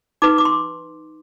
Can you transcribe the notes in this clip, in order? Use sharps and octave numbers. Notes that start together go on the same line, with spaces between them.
D#4 B4 D6
D6
C6